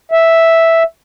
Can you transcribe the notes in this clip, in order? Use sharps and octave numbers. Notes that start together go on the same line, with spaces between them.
E5